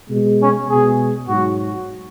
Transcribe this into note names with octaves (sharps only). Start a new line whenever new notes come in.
B2 G#3
C#4
B2 G#3 G#4
G#2 F#3 F#4